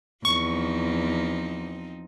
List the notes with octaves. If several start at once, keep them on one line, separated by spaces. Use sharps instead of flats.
E2 F3 C4 D#4 C#6